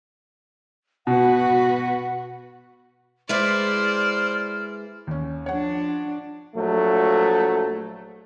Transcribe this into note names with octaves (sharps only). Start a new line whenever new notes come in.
B2 F#4 B4 F#5
G#3 E4 B4 C5 D5 F6
D#2 C#4
F3 D4 C#5 F#5
A#1 F#3 A3